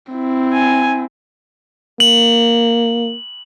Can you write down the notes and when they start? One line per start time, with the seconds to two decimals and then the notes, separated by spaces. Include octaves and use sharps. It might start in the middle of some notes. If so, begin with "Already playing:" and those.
0.13 C4 E4
0.53 G#5
2.00 A#3 F#7